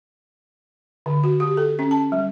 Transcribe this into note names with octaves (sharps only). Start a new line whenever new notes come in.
D3
F#4
G4
A4
C#4
A5
G3